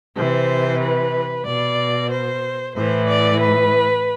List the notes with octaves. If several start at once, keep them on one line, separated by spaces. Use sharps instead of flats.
C3 E3 C5
B4
B2 D5
C5
A2 E3 C5
D5
B4